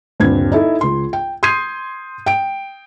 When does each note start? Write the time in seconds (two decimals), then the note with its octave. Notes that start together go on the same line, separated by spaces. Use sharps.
0.20 D#1 G2 D3 C4 G#6
0.52 D#4 E4 A4
0.81 C#2 C6
1.13 G5
1.43 C6 D#6 G6 G#6 C7 D#7
2.26 G5 D7